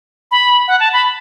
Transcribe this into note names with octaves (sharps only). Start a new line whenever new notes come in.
B5
F#5
A5
B5